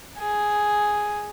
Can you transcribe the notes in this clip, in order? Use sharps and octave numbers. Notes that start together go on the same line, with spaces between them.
G#4